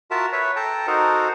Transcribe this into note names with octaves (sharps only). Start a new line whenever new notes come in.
F4 F#4 A#4 E5 A5
B4 C#5 E5
A4 G5 A5 A#5
D#4 F#4 A4 A#4 C5